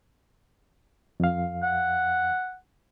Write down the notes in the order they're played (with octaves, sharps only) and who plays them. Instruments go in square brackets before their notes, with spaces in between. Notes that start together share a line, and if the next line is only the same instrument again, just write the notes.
[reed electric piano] F2 F5
[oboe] F#5